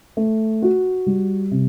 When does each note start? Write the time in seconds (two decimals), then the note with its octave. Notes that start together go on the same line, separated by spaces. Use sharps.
0.17 A3
0.62 F#4
1.06 G3
1.51 C3